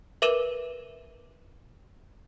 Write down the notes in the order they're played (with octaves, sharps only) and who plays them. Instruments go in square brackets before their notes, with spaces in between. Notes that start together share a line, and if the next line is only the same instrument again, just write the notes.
[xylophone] A#4 B4 E5 D6 D#7 E7